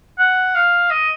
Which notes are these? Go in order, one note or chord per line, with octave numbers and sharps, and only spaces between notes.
F#5
F5
D#5